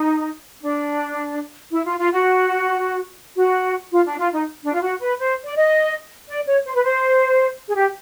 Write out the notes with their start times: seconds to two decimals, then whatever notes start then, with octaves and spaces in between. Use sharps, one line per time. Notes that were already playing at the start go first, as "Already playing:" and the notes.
Already playing: D#4
0.62 D4
1.71 E4
1.85 F4
1.99 F4
2.12 F#4
3.36 F#4
3.91 F4
4.05 D4
4.18 F4
4.32 D#4
4.64 D4
4.74 F4
4.82 F#4
5.01 B4
5.19 C5
5.43 D5
5.55 D#5
6.28 D5
6.46 C#5
6.65 C5
6.74 B4
6.83 C5
7.68 G#4
7.75 G4